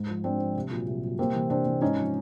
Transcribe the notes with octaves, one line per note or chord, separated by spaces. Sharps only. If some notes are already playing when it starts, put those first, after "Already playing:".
Already playing: G#2
F3
G#2 C4 D4
F3
C2
A#2 F#3
C2
A#2 F#3
C2 A#3 C4
C3 E3
C2 C4 D4
C3 E3
G#2 C#4 D#4
F3